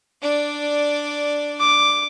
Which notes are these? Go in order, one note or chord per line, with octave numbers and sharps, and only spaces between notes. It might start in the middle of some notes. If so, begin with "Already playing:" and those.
D4 D5
D6